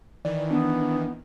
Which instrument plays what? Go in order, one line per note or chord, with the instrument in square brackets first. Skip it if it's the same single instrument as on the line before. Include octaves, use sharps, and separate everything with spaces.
[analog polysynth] D#3 E3 [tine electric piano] D5
[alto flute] B3 [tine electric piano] D4